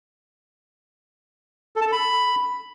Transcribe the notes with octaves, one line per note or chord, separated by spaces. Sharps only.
A4
A5
A4
B5